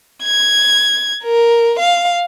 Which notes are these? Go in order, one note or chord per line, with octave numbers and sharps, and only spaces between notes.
G#6
A#4
F5